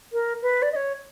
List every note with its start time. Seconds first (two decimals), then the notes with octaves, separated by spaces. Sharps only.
0.13 A#4
0.42 B4
0.62 D5
0.72 D#5
0.76 C#5